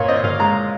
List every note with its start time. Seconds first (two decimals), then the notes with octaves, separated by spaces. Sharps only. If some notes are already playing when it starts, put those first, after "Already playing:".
Already playing: A#2 C#5
0.08 C4 D#5
0.24 A#2 F5
0.40 G#3 A#5